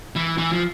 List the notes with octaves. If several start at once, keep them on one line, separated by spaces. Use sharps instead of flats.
E3
E3
F3